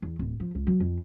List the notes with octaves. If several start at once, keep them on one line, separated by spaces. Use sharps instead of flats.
E2
D1
F3
C#2
F#3
F2